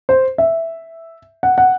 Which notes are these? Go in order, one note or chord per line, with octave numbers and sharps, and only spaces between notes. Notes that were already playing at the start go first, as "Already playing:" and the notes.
C5
E5
F#5
F#5